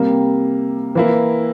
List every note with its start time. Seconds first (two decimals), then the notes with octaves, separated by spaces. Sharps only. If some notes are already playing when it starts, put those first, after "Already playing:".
Already playing: C3 G3 A#3
0.95 E3 A#3 E4